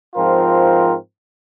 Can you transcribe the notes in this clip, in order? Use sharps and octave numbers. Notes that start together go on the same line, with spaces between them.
G#2 F3 C4 F4 A#4